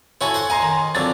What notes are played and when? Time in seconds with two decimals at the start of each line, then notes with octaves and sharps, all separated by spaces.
0.21 E4 F#4 A4 C#5 G#5
0.34 C5 F#5
0.50 D#5 G#5 A#5 C6
0.62 D#3
0.95 F2 D3 F#3 A6